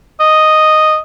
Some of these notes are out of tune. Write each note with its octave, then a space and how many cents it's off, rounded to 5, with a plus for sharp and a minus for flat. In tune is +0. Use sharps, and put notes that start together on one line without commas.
D#5 -5